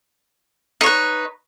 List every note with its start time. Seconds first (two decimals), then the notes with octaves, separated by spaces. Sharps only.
0.81 D#4
0.83 C#5
0.86 B4